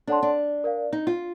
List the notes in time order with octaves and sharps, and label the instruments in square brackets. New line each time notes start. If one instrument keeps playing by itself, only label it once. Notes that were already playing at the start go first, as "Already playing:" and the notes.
[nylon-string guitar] D4 [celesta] A4 C#5 F#5 A5 C6
[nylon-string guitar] D4
[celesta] A#4 D5 F5
[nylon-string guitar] D#4
F4